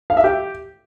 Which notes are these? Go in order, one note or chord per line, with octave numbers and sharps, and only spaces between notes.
F5
E5
G4